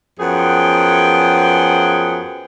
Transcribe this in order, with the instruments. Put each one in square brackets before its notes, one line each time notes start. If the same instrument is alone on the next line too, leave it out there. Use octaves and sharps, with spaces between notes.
[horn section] F#2 F3 B3 G#4 F#5 G5